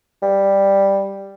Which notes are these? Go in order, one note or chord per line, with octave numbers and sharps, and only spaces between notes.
G3